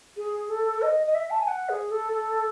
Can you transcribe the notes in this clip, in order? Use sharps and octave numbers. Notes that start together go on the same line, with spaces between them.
G#4
A4
D#5
D#5
E5
A5
G#5
F#5
G#4
A4
A4